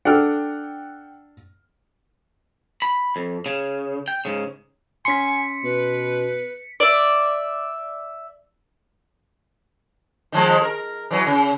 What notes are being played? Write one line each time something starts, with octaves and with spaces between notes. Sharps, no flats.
D4 A4 F#5 G5 F6
B5
F2
C#3
G5
G#2 C#3
C#4 G#5 C6 B6 C#7
B2 B4
D5 E5
D#3 F3 G#3
A#4
E3 F#3
C#3